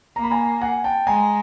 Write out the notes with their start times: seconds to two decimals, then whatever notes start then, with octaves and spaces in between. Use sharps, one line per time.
0.16 A#3 A#5
0.24 B5
0.31 G#5 A#5
0.61 F#5 G#5
0.84 G5 A5
1.07 G#3 G#5 A#5